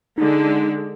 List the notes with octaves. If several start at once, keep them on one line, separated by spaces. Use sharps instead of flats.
D3 G#3 D#4